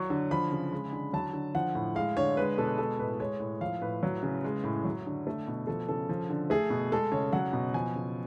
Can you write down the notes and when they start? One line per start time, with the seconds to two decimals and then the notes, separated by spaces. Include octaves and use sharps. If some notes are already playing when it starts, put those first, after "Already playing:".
Already playing: F#3 C#6
0.10 D3
0.31 F3 B5
0.51 C#3
0.71 G#3
0.93 D3
1.13 F#3 A5
1.33 D3
1.55 F3 F#5
1.75 A2
1.95 G#3 F5
2.17 D3 C#5
2.37 G#3 B4
2.58 B2 A4
2.78 G#3 A4
2.99 A2 B4
3.19 G#3 C#5
3.40 A2
3.61 F3 F5
3.82 A2 B4
4.03 F#3
4.23 C#3
4.44 G#3
4.64 A2
4.85 F#3
5.06 D3
5.27 A3
5.48 B2
5.67 F3 A4
5.88 C#3 A4
6.09 F3
6.29 D3
6.50 A3 G#4
6.70 B2
6.91 G#3 A4
7.12 C#3 C#5
7.33 F#3 F#5
7.53 B2
7.74 F3 G#5
7.95 C#3